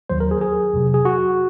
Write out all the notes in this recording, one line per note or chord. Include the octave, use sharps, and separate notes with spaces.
D#2 D#3 F#3 C5
A#4
G#4
G#4
F2 C3 F#3
G#4
F#4